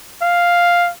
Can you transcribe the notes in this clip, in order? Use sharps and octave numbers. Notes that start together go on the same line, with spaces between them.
F5